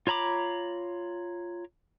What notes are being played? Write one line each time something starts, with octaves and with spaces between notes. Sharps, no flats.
F4 C#5 A#5 B5 D6